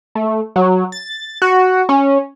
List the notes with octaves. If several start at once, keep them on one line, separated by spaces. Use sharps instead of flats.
A3
F#3
A6
F#4
C#4